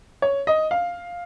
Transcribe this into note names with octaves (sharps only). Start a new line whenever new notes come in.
C#5
D#5
F5